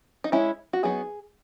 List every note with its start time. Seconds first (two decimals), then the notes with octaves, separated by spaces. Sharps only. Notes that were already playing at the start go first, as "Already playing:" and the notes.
0.24 D#4
0.32 G#3 C#4 E4
0.73 F#4
0.83 F#3 B3 D#4 G#4